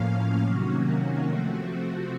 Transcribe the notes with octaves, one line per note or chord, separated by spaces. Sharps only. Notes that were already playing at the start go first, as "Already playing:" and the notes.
Already playing: A2 F3 A#3 C#4 F5
C3 D#3 F#3 A#3 C#4 F#4
C3 F3 A3 C4 F#4